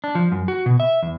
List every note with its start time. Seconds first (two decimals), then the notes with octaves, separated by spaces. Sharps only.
0.04 D4
0.15 F3
0.32 F#2
0.48 F#4
0.66 B2
0.80 E5
1.03 E2